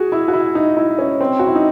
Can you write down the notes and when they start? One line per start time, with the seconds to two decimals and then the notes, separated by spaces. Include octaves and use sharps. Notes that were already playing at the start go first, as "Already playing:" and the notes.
Already playing: F#4 G#4
0.12 E4
0.28 F#4
0.33 E4
0.55 D#4
0.77 E4
0.99 C#4
1.21 C4
1.39 F#4
1.47 E4
1.55 D#4